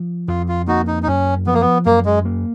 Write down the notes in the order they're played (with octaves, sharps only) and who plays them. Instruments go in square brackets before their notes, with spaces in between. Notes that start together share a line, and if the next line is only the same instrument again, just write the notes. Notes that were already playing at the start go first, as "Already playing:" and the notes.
Already playing: [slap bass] F3
[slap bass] F2 [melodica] F4
[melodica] F4
[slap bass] A#3 [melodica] D#4 F#4
[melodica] D#4
D#4
[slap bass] F#2 [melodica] C#4
[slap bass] F3 [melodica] B3
[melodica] A#3
B3
[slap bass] F#2 [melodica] A#3
[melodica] G#3
[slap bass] A#3